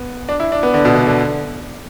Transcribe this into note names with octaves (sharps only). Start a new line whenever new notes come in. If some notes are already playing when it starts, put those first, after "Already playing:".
Already playing: B3
D4
E4
D4
B3
D3
B2
D3
D3